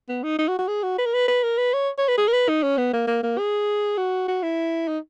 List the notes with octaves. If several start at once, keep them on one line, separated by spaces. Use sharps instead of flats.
B3
D#4
D#4
F#4
F#4
G#4
F#4
B4
A#4
B4
B4
A#4
B4
C#5
C#5
B4
G#4
A#4
B4
D#4
C#4
B3
A#3
A#3
A#3
G#4
F#4
F#4
E4
D#4